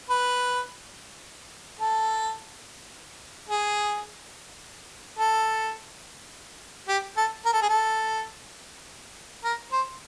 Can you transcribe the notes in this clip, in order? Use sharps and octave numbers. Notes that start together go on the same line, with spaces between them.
B4
A4
G#4
A4
G4
A4
A#4
A4
G#4
A4
A#4
C5